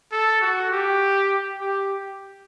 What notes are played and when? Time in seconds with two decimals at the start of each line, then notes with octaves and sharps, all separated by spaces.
0.12 A4
0.41 F#4
0.71 G4
1.61 G4